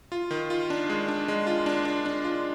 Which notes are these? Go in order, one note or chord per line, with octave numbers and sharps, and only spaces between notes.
F4
D#3
F4
D4
G#3
D4
G#3
F4
D4
D4
D4
F4